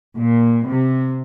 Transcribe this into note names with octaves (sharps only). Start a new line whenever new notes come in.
A#2
C3